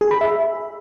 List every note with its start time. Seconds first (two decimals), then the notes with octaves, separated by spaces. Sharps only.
0.01 G#4
0.11 B5
0.21 E5